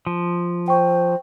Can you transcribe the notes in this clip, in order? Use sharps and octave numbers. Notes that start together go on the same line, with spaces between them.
F3
C5 G5 C#6